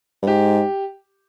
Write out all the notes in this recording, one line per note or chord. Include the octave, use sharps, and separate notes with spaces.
G2
G#2 G4